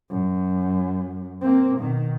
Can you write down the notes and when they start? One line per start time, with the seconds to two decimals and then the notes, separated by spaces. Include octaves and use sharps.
0.10 F#2
1.41 A#3 C4
1.80 B2 D#3